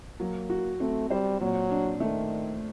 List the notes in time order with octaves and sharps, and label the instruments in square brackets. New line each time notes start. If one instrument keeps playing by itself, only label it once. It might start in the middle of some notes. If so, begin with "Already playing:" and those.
[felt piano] F#3 [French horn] A#3
[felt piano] F#4
[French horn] A3 [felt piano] C4
[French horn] G3 [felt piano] C5
[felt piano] A#2 [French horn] F#3
[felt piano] D4
[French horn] D#3 [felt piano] A3